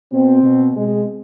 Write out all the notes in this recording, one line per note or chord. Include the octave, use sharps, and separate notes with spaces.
B2 C4
B2
B2 G#3